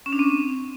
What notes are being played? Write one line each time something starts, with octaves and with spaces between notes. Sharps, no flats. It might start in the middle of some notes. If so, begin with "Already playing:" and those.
C#4
D4
C4